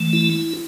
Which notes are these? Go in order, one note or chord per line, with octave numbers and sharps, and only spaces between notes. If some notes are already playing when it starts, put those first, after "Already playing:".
Already playing: E3 A3
E4